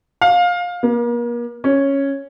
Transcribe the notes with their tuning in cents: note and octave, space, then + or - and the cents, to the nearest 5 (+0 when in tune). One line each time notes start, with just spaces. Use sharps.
F5 +20
A#3 +40
C#4 -5